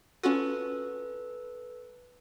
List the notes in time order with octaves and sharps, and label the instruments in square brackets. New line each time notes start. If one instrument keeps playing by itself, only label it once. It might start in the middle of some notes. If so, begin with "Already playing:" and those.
[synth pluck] C#4 F4 F#4 [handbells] A4 B4